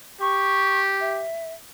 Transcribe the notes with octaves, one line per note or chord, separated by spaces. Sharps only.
G4 C#6
E5